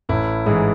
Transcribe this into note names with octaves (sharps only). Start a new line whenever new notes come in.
A1 E4
G#2 E3 G#4